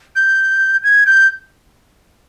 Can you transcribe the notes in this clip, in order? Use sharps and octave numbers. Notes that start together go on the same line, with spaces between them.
G6
G#6
G6